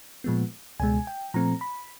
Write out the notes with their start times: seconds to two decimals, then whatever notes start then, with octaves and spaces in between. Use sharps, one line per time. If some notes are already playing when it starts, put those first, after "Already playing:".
0.24 A#2 F3 G#3 B3
0.80 C#2 B2 G#3 G#5
1.07 G5
1.34 A#2 F3 A3 C4 A#5
1.61 B5